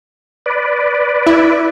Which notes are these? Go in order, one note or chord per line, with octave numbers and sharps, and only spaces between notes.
B4 D5
E4